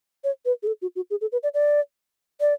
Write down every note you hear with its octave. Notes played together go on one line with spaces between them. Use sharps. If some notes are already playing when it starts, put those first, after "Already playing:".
C#5
B4
G#4
A4
F#4
F#4
G#4
A4
B4
D5
D5
D5